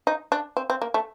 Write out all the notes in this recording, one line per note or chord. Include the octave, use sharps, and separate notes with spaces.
D#4
D4
C4
C4
A#3
A3